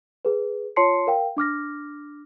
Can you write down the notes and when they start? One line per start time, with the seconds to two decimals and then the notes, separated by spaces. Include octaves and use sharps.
0.25 G#4 B4
0.76 F4 C#5 A5 C6 C7 C#7
1.07 A#4 F5 G5
1.37 D4 D6 F6 A#6